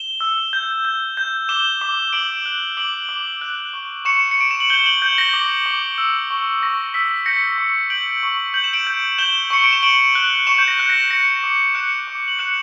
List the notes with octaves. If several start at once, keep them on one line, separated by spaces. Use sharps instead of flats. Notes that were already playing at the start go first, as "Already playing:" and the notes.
Already playing: E7 G7
E6
G6
G6
G6
D6 E7 G7
D6
D6 D7 F#7
F#6
D6 D7 F#7
D6
F#6
C#6
C#6 C#7 E7
C#7
C#6 D7
E7
F#7
G6 E7 G7
D7 F#7
G6
A#6
D6
D6
E6
C#6
C#6 A#6
E6 B6
G6 A#6 C#7
C#6
G6 D7 F#7
C#6
G6 F#7
E7
D7 F#7
G6
G6 E7 G7
C#6 C#7
D7
E7
C#6 D7 F#7
F#6
C#6 C#7 E7
G6
A#6
F#6
A#6
F#6 A#6 C#7
D6
F#6 C#7 E7
D6
F#7
F#6 C#7 E7